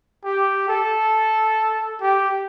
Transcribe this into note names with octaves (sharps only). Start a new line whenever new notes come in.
G4
A4
G4